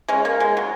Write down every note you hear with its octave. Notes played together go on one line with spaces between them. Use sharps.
G#3 C#4
A#3
G#3
F#3